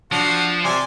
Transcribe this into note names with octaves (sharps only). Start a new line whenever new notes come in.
F3 D4 F#4
C3 D5 G#5 C6